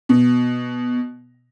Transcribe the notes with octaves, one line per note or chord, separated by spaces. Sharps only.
B2